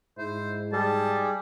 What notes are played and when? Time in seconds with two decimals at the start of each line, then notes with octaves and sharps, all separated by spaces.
0.18 G#2 E4 C5
0.73 G3 G#4 A5